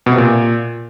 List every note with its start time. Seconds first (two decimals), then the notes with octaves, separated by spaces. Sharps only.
0.06 B2
0.12 C3
0.17 A#2